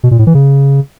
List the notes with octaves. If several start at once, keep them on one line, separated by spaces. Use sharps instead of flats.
B2
A#2
A2
E3
C#3